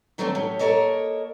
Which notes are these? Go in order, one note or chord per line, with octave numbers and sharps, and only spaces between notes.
D#3 F#3 A3 B3 C4 D4
A2 E3 F#3 C#4 G4
A#3 A4 A#4 C#5 D#5